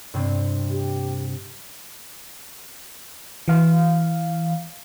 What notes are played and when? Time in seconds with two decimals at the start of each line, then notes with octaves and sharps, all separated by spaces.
0.14 G2 C3 C4
0.70 G4
3.48 E3 F5